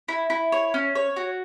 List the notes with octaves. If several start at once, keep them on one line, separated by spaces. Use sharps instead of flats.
E4
E4
C#5
C#4
C#5
F#4